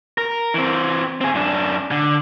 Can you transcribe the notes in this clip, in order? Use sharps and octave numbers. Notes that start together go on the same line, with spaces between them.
A#4
E3 C4
C4 G#4
F#2 D4
D3